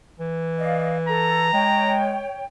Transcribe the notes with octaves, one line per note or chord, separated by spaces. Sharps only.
E3
D5 D#5 F5
A4 A#5
G#3 C#5 G5